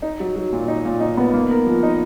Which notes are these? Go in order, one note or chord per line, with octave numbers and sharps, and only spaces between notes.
D#4
F#3
F#3
A#2
D#4
A#2
D#4
B3
A#3
A#4
F3
D#4